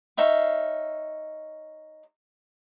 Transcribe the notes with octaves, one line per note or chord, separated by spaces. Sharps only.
D#4 C#5 E5 F5